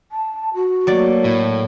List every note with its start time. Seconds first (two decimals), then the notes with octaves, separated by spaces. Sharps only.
0.12 A5
0.55 F#4
0.87 F#3 A3 A#3 D5
1.24 A2